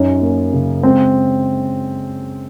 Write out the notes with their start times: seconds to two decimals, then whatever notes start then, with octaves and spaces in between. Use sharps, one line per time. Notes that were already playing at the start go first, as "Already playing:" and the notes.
Already playing: F#2 C#4 D#4
0.22 A#3
0.53 C#3
0.83 G#3 C4